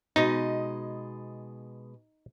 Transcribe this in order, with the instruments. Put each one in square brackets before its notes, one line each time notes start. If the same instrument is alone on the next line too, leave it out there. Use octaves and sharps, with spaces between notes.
[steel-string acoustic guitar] B2 G#3 D#5 [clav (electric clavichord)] D#4